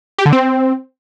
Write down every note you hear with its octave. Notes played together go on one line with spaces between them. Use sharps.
G4
D3
C4